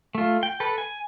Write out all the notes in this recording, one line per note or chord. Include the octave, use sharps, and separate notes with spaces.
A3 F4
G5
A4 B4
G#5